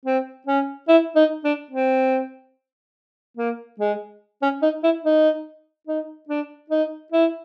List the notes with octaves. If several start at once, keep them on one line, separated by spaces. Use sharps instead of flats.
C4
C#4
E4
D#4
D4
C4
A#3
G#3
C#4
D#4
E4
D#4
D#4
D4
D#4
E4